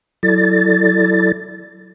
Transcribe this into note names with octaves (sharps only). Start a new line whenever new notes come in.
F#3 E4 A4 D5 A6